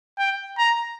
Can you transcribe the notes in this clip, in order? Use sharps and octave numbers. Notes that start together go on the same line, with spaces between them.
G5
A#5